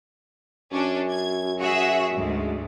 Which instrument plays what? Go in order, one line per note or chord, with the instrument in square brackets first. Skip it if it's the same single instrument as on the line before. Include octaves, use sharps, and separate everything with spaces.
[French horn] F#2 [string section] C#4 D4
[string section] G#6
F#4 G#4 E5
D2 G#2